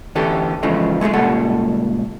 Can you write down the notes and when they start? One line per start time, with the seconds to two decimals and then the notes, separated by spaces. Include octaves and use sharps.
0.15 D2 E3 C#4 G4 A4
0.63 C#3 E3 F3 G#3 A3
1.01 G#3 A3 D#4 G#4
1.13 C#2 A#2 G3 A4 F#5